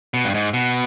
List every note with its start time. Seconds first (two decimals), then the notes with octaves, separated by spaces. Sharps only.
0.14 B2
0.24 G2
0.34 G#2
0.53 B2